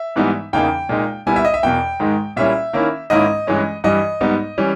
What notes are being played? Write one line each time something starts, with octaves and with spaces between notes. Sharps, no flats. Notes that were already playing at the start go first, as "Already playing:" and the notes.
Already playing: E5
G#2 E3 G3 B3 D#4
E2 C#3 E3 A#3 D#4 G5
A#2 G#3 D#4
A#2 G3 B3 E4 G#5
E5
D#5
E5
E2 B2 A#3 G5
G#2 D#3 G#3
A#2 G3 C#4 E4 E5
D#3 A#3 C#4 E4
G#2 D#3 A#3 C#4 E4 D#5
G2 E3 G#3 C#4
G2 E3 G3 D#5
G#2 G3 B3 D#4
E3 G3 C#4